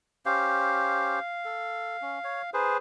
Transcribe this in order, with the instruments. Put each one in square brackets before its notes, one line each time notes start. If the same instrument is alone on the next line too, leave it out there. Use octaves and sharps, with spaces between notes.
[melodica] C#4 G4 C5 [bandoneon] F5
[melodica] A4
C#4
C#5
[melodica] D#4 [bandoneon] G#4 B4 C5